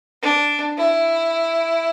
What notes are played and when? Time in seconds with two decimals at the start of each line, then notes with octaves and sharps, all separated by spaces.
0.23 D4
0.77 E4